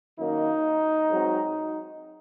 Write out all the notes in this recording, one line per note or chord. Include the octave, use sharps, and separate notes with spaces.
F#2 D#3 A#3 D#4
G#2 F#3 C4